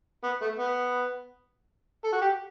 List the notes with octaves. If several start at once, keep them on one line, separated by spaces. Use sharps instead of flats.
B3
A3
B3
A4
F#4
G4